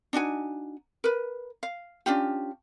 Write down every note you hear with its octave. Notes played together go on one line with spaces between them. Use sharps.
D4 D#4 F#4 G#5
A#4 B4
F5
C#4 D4 F4 G4